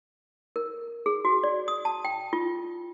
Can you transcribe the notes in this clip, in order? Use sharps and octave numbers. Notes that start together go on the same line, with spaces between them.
A#4
G#4
F#4
D5
D#6
A5
G5
F4